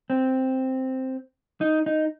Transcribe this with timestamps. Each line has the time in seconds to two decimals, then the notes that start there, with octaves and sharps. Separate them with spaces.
0.10 C4
1.61 D#4
1.86 D#4